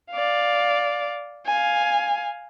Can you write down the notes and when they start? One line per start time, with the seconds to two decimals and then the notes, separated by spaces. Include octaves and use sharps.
0.11 D5 F5
1.46 F5 G#5